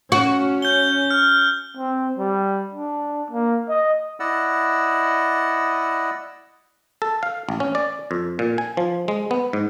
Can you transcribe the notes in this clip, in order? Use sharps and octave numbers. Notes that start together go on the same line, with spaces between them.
C#4 F#4
G6 G7
F6
C4
G3
D4
A#3
D#5
E4 D5 D#5 F#5 E6
A4
F5
A1
C#4
D5
F2
A#2
G#5
F3
G#3
B3
G#2